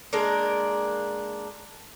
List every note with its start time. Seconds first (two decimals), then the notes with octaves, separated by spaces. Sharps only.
0.13 G#3 A#3 D4 A#4